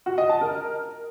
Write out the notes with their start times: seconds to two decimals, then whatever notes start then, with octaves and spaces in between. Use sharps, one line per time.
0.06 F#4
0.18 D#5
0.29 A5
0.41 A#4